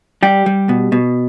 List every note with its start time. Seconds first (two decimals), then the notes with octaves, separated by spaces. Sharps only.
0.23 G3 G4
0.46 G3
0.69 B2
0.92 B2